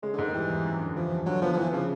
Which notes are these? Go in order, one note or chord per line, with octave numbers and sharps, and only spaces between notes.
C#3 G#3
D3
G#2 D#3
E3 G3
E2
F#2
D3
E3 F3
G2
D3 F#3
F3 B3
F3
E3 B3
C#3 F3